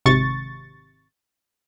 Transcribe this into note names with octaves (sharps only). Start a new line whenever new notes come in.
G#1 C3 C#6 A6